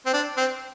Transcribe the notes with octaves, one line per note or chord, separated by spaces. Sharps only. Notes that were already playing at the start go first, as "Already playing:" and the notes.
C4
D4
C4